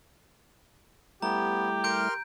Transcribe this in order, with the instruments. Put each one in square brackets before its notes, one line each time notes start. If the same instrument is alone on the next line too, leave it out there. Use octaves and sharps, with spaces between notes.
[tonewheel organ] G3 A3 E4 [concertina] B3 [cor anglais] G4 [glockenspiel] A#5
[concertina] A#4 C6 F6 [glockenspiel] G6 D7